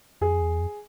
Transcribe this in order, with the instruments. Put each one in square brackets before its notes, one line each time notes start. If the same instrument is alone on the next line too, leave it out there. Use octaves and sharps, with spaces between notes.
[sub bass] F2 [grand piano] G#4
[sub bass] E2
F2